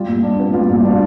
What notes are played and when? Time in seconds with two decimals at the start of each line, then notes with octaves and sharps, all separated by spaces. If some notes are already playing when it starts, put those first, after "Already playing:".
Already playing: G3 F4
0.08 A#2
0.23 D4
0.39 B3
0.53 G3 F4
0.69 A#2 F4
0.84 D4
0.90 F4